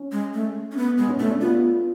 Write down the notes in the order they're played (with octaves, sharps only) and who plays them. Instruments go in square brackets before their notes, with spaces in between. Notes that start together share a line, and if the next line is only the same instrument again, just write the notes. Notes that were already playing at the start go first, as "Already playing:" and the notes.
Already playing: [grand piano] C#4
[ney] G#3
A3
C#4
B3
[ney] G#3 [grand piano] B3
[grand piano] C#4
[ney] A3 [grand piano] C#4
[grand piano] D4
[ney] B3 [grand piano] F4